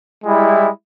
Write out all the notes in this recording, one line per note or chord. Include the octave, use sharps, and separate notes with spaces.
G3 G#3 E4